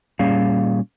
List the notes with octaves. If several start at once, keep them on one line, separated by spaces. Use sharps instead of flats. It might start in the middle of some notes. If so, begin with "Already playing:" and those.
A#2 G3 C#4 G#4 F5